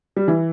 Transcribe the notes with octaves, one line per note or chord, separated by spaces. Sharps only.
G3
E3